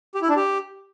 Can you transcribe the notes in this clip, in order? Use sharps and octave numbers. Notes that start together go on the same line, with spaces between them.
G4
E4
D4
G4